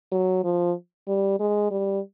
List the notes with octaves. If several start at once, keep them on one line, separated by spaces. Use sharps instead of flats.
F#3
F3
G3
G#3
G3